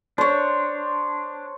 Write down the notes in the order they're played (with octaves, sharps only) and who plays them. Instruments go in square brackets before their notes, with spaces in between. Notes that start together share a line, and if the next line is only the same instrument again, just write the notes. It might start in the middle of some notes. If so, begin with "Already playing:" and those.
[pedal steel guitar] D4 [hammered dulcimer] C5 C#5